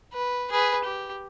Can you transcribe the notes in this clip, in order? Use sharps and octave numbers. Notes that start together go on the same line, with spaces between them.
B4
G#4 B4
G4